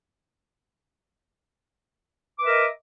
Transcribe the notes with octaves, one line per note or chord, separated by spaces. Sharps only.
A#4 B4 D#5 E5 D6